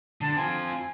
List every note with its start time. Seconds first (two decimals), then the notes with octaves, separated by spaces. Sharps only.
0.21 D3 A5
0.36 C4 F4 G#5